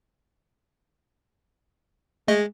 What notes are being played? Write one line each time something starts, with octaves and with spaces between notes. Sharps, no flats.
G#3 A3 D#5